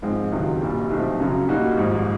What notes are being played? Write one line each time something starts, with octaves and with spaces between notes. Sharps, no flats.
G#2 F3 G#3 C4
C#2 C3 D#3 F#3
A#1 A#2 G3
B1 A#2 F3 A3 C4
F#2 C#3 F#3
A#2 G3 A#3 D#4 F#4
G#1 G#2 F3